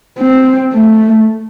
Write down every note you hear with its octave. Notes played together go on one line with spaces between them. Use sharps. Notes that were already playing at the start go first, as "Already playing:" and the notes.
C4
A3